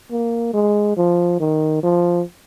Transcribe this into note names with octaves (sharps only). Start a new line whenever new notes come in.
A#3
G#3
F3
D#3
F3